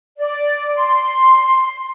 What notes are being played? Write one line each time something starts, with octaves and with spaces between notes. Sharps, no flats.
D5
C6